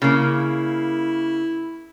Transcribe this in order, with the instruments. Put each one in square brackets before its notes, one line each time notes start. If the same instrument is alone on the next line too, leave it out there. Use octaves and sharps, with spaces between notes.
[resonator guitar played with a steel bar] C#3 A#3 [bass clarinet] E4